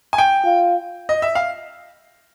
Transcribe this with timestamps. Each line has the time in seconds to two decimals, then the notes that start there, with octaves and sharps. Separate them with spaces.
0.13 G#5
0.18 G5
0.45 F4
1.09 D#5
1.22 E5
1.35 F5